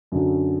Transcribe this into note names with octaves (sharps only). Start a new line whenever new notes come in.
F#2 D3 F#3